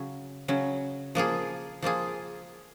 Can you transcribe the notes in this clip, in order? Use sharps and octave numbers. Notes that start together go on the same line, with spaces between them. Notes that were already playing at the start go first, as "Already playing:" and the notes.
Already playing: C#3 F#3 C#4
C#3 F#3 C#4
F3 A#3 F4 G#4
F3 A#3 F4 G#4